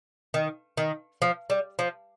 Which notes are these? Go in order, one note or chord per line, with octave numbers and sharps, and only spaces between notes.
D#3
D#3
F3
G3
F3